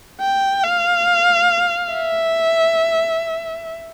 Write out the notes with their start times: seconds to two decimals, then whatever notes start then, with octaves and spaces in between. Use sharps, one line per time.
0.21 G5
0.64 F5
1.93 E5